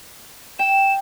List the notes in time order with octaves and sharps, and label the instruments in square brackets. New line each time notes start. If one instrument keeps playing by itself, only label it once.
[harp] G5 [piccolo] E7